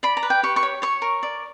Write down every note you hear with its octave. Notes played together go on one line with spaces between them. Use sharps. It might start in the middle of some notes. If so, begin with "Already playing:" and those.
D5 B5
A#5
B4
G5
G4 C#6
C#6
C#5
C#5 C#6
A#4
D5